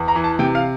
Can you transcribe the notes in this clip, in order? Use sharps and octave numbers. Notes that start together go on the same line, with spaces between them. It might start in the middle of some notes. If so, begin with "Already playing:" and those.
Already playing: E2
A#5
E3
A5
C3 G5
F5